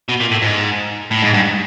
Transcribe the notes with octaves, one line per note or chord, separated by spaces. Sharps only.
B2
A#2
A2
G#2
A2
G#2
G2